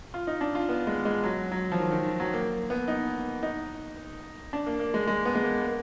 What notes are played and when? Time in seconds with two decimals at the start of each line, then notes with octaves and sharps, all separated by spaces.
0.14 F4
0.27 D#4
0.41 D4
0.55 F4
0.69 B3
0.87 G#3
1.05 G#3
1.23 F#3
1.52 F#3
1.72 F3
1.79 D#3
1.92 D#3
2.20 F#3
2.33 A#3
2.70 B3
2.88 D#4
3.43 D#4
4.53 D4
4.66 A#3
4.79 A#3
4.94 G#3
5.07 G#3
5.25 B3
5.35 G#3
5.44 A#3
5.62 A#3